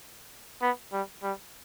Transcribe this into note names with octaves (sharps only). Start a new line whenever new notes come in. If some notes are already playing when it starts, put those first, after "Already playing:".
B3
G3
G3